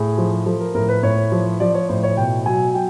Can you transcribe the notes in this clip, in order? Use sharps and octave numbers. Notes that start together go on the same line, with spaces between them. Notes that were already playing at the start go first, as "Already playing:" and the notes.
Already playing: A2 G#4
F3
F3 A4
A#4
A2 A#4
B4
A2 C#5
F3
F3 D5
C#5
A2 C5
C#5
B2 G5
F#3 G#5
F#3 G5